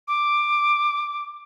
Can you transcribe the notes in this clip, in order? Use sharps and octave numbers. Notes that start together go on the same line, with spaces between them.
D6